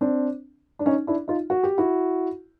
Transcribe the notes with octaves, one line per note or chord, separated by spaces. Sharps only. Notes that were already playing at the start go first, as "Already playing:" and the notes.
C4 D4
D4
C#4 D#4
D4 E4
D#4 F4
F#4
G4
E4 F#4